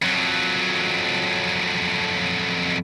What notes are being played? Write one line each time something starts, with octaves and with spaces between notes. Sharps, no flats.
F2 F#3